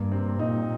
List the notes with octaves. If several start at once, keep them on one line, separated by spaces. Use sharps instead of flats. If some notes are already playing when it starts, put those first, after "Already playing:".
Already playing: G2 A#3
C3 C4
A#2 D#4 D#5